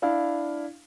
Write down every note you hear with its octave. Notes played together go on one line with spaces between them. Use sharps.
D4 E4 F5